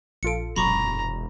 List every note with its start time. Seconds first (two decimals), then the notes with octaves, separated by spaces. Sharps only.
0.23 A#1 F4 A4 C#7 D7
0.56 E1 F#2 A#2 A#5 B5 C#6 D6